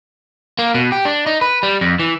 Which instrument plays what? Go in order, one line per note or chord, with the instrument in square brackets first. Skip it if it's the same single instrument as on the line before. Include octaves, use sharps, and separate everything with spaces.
[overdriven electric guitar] A#3
B2
G4
D4
D#4
B4
G3
F2
E3